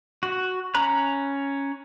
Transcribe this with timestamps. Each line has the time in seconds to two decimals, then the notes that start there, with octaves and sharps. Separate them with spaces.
0.23 F#4
0.74 C#4 A#5 B5 F#6